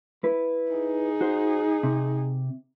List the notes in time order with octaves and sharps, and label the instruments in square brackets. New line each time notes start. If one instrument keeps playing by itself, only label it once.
[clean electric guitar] E4 B4
[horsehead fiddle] D#4 G#4
[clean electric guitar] F#4 C5
C3